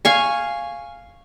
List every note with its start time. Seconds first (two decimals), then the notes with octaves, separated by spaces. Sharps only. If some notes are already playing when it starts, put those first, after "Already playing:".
0.05 F5 G#5 C#6